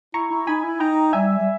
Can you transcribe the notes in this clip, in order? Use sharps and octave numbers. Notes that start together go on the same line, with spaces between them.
E4 A#5 C#6
E4
D#4 G#5 B5
E4
D#4 G5 A#5
G3 E5 G#5
G3